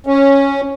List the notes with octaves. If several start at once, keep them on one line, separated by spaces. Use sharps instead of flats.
C#4